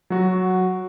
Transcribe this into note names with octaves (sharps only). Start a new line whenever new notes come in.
F#3 F#4